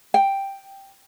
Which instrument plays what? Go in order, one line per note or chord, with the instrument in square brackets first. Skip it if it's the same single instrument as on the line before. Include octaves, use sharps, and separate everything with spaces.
[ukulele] G5